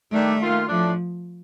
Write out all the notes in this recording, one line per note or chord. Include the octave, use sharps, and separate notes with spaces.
D#3 G3 A3 D4
D#3 A#3 F4
A2 F3 A3 D4